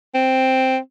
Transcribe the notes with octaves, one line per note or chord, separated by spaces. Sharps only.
C4